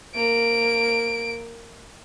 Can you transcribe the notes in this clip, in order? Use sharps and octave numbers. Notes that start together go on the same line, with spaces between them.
A#3 D7